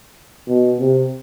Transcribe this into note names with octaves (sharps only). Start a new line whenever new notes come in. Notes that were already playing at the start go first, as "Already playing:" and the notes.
B2
C3